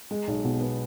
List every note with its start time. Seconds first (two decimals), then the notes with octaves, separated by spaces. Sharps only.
0.11 G#3
0.27 B1
0.44 B2
0.61 B3